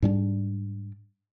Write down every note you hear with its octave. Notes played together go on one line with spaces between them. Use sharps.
G#2 G3 C#4 D4